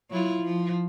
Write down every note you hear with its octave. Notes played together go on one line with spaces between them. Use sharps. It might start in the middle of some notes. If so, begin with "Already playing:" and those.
F#3 E4 F4
F3